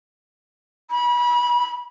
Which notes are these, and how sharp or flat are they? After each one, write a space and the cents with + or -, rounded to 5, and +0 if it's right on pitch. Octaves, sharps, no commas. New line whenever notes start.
B5 -30